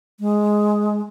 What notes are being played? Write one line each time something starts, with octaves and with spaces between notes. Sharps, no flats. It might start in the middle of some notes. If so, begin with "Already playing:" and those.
G#3